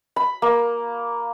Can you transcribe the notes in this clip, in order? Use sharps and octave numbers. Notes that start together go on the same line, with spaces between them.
B5
A#3